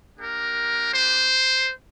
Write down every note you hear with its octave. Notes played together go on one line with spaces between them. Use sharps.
A#3 D4 G4 A#4
C5